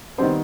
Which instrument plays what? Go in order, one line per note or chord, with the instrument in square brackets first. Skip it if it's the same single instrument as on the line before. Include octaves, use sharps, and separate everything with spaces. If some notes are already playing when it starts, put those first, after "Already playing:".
[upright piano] D#3 G3 B3 C4 C5